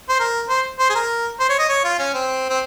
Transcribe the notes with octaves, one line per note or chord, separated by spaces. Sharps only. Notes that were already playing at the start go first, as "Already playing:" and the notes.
C5
A#4
C5
C5
G#4
A#4
C5
C#5
D#5
C#5
F4
C#4
C4
C4